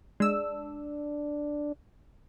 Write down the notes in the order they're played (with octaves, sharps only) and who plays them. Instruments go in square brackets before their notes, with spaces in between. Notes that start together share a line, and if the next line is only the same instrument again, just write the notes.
[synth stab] G#3 E6 [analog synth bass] D4